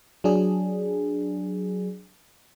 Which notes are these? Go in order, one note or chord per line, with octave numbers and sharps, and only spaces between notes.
F#3 D4 G#4